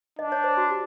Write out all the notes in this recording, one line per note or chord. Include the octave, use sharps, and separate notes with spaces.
D4 D#5
C#5
C5
F#4
G4